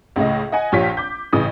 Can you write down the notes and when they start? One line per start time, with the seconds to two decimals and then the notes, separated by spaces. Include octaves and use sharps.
0.16 C#2 A2 C#3 D#5
0.52 D#5 F#5 G#5
0.72 A#1 F4 G4 C#5 B6
0.97 D6 G6
1.33 A1 C#3 E3 D#6